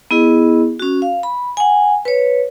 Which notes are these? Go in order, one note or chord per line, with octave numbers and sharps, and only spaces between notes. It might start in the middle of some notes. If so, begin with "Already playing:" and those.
B3 E4 G#4 D#5
C#4 F#4
F5
B5
F#5 G#5
B4 C#5